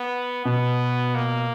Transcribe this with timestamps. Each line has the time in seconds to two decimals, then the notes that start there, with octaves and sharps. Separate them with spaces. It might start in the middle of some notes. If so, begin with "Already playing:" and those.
Already playing: B3
0.45 B2 B3
1.15 A#3